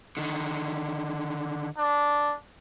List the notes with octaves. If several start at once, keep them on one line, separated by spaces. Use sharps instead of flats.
D3 D#3
D4